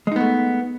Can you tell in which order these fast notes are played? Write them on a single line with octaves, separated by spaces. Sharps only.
G#3 D#4 B3 A3